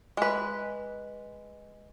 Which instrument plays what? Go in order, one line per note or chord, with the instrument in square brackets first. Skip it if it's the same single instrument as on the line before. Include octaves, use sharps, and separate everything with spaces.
[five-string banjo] G#3 B4